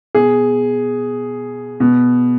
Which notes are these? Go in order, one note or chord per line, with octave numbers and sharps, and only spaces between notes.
B2 G#4
B2